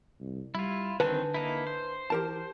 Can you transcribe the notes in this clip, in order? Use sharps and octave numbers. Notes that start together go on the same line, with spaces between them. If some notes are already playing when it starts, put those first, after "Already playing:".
C2
G3 E4 F4
D3 D#3 C4 B4 G#5 A5
A#3 D#4 E4
C5
E3 G4 A#4 A5